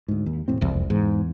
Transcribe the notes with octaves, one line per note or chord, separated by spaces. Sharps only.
D2 G#2
D#2
E1 A2 C4
E1 C2 F2
E2 G#2